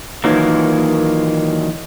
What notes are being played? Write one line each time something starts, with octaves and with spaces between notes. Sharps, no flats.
A#2 D#3 E3 F#3 A#3